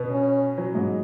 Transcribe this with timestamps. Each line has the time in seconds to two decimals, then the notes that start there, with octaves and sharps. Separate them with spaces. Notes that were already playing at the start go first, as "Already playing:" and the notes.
Already playing: B2 B3
0.10 C#4
0.58 F#3
0.75 G#2 G#3